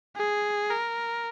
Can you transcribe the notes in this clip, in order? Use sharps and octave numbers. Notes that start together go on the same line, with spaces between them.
G#4
A#4